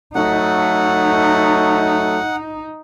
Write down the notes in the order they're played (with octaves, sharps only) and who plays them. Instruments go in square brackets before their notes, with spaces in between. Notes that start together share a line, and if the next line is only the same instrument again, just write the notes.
[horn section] F#3 A3 [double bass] D#4 [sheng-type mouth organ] F#5